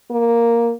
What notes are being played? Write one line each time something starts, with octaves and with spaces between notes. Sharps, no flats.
A#3